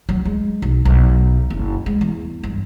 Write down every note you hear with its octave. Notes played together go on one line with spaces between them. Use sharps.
F#3
G#3
B1
B1
F#1
G#3
E2
G2